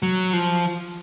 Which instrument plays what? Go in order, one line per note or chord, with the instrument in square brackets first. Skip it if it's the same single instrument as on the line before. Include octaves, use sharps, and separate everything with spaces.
[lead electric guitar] F#3
F3